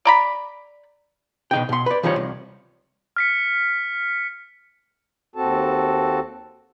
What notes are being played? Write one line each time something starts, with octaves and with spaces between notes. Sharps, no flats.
D5 A#5 B5
B2 D#4 G5
B2 C6
B4 D5
E3 F3 G3 D#4 C#5
C2
F6 B6 C#7
D#2 C4 F#4 A4 A5